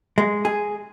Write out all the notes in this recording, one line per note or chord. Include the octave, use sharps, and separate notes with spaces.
G#3
G#4